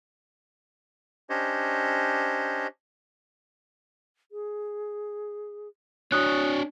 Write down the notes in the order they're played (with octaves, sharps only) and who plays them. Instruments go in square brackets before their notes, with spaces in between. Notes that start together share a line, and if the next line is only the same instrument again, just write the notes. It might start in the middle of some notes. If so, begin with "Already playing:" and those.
[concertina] C#4 D4 G4 C5 C#5 D#5
[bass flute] G#4
[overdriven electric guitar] D4 C#5 [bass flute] F#4 [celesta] D#6 F#6